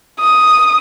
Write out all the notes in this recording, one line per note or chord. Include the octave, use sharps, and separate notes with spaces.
D#6